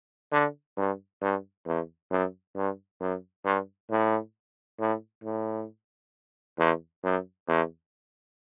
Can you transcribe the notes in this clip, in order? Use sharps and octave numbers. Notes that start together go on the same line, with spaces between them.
D3
G2
G2
E2
F#2
G2
F#2
G2
A2
A2
A2
E2
F#2
E2